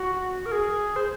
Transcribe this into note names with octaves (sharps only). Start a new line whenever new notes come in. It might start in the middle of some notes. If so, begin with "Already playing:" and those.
Already playing: F#4
A#4
G#4
C5